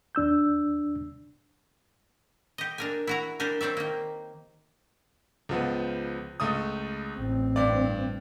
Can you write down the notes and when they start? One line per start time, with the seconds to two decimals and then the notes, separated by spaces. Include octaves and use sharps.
0.15 D#2 D4 E6 G6
2.58 G4 D#5
2.78 D4 A#4 G#5
3.07 E4 F#4 A#5
3.40 D4 G4 A#4 G#5
3.61 C4 C#5 D5 E5
3.77 D#3 A#3
5.49 C#2 F3 B3
6.40 C#2 A3 D#6
7.18 A1 C4
7.56 G2 D5